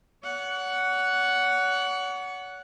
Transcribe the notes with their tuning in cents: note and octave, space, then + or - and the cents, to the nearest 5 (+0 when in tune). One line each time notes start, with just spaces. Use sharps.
C#5 +40 F#5 +0